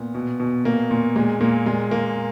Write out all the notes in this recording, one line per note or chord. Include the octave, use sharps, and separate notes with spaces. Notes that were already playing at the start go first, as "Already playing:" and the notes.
Already playing: A#2 B3
B2
B2
A#2 A#3
A#2
A#2 G#3
A#2 A#3
A#2 G#3
A#2 A#3